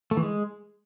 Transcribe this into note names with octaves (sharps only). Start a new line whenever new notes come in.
A3
E3
G#3